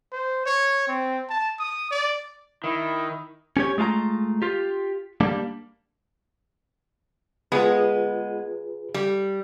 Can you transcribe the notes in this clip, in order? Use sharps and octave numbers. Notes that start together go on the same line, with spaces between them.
C5
C#5
C4
A5
D#6
D5
D#3 E4
C#4 G4 C#5
G#3 A3 F4 G#5 A#5
F4 G4
G3 A#3 D4
G#3 B3 F4 G#4 B4
G3